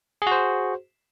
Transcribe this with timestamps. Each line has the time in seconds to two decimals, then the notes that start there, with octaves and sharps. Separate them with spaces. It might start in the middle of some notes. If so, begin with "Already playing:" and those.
0.22 G#4
0.27 F#4
0.32 C5